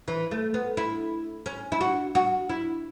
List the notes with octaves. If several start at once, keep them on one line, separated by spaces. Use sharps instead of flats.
E3
A3
B3
E4
C#4
E4
F#4
F#4
E4